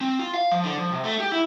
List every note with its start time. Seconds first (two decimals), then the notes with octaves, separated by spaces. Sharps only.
0.01 C4
0.19 F4
0.34 F5
0.51 F3
0.64 D3
0.78 F3
0.92 C3
1.04 A3
1.20 G4
1.32 E4